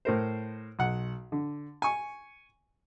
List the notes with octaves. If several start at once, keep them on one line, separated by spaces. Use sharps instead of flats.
A2 A#4 C5
B1 F#5
D3
G#5 C#6